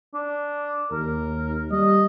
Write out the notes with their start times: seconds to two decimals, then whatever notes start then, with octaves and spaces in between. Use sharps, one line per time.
0.14 D4
0.92 D#2 A#4
1.72 G3 D#5